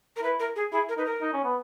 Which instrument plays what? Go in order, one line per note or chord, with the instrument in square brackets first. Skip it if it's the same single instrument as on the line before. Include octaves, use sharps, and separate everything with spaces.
[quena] A#4
[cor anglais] E4 [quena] B4
[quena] A#4
G#4
[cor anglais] E4 [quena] G#4
[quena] A#4
[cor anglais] D#4 [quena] B4
[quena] A#4
[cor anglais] D#4
C#4
B3